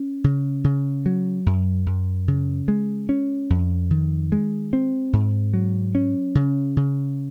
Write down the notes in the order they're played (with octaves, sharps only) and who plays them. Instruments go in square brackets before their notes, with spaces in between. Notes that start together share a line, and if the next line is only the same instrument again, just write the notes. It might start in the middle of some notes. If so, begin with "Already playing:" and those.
Already playing: [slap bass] C#4
C#3
C#3
F#3
F#2
F#2
C#3
G#3
C#4
F2
D#3
G#3
C4
G#2
F#3
C#4
C#3
C#3